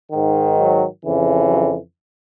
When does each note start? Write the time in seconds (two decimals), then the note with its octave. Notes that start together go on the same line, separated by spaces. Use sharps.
0.12 G#2 D#3
0.57 F#3
1.03 F2 C#3 E3
1.48 F#3